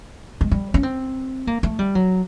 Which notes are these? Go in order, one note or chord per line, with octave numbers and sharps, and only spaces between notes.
G#3
G3
C#4
C4
A#3
A3
G3
F#3